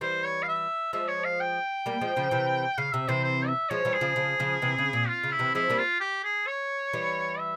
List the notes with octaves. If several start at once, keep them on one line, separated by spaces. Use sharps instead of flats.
E3 G3 C5
C#5
F5
E5
F3 G#3 E5
C#5
F5
G5
G3 A#3
F3 G#3
C#3 F3
C3 E3
C#3 F5
C3 E5
C3 E3 C5
C5
E5
F3 G#3 C#5
E3 G3
G#4
C#3 F3
C#3 F3
C#3 F3
C3 E3
C#3
A#2
F4
C#3
E4
C3 E3
F3 G#3 E4
G3 A#3
F4
G4
G#4
C#5
E3 G3
E5